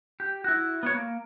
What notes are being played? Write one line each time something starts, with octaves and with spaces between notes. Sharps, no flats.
G4
E4 F#4
B3 F#4 C#5
A#3